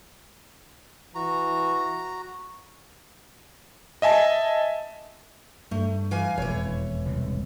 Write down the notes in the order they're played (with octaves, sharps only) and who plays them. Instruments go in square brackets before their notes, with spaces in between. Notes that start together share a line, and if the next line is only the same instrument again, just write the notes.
[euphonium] E3 [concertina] F#4 A#5
[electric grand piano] D#5 E5 G#5 A5
[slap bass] G2 [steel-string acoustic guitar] A3
[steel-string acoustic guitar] E3 F5 G#5
[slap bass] E1 F2 [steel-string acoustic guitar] E3 C#5
[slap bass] E1 C2 A2